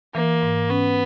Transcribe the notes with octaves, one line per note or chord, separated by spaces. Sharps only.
E3 A#3
G#2
B3 C#4